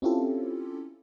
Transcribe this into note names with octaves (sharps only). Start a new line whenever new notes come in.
C4 C#4 E4 F4 G4 A4